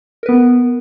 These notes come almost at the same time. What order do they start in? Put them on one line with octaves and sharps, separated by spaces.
A#4 B4 B3